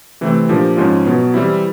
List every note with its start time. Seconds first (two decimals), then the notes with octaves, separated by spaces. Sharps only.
0.21 C3 E3 A3 C4
0.49 A#2 F3 A#3 D4 G4
0.77 G#2 F3 G#3 C#4 F4
1.06 B2 F#3 B3
1.34 E3 G3 C4 E4